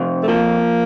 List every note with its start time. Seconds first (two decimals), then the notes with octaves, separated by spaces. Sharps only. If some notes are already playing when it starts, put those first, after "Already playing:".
Already playing: F2 C3
0.23 A3
0.28 F3 A#3